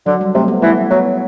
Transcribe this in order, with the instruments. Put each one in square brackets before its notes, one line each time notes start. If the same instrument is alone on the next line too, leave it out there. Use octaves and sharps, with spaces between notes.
[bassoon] D3 [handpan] F#3
[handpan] G3
[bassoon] C3 [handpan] A3
[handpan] B3
[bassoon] E3 [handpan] A3
[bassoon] F#3 [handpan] B3